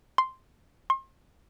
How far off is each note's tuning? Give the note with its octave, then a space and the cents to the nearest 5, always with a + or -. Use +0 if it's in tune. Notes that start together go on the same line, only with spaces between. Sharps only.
C6 -5
C6 +35